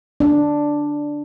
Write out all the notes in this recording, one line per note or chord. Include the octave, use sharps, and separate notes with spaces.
D4